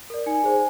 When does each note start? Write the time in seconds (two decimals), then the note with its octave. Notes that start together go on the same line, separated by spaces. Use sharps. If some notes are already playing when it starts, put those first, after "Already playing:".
0.10 A#4 D5
0.26 D#4 G#5
0.44 G#4 C5